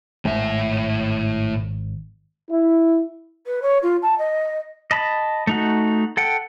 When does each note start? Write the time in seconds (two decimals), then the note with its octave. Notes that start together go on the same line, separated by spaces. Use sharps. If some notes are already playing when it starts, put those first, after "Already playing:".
0.25 G#1 A2 E5
2.50 E4
3.47 B4
3.62 C#5
3.83 F4
4.02 A5
4.19 D#5
4.91 D#5 A5 B5
5.47 A3 D#4 F#4
6.17 A4 F#5 G5